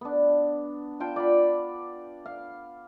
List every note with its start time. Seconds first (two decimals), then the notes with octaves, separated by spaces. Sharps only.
0.01 B3 D4
1.00 F4 G5 A5
1.16 D5 F5 F#5 B5
2.26 F5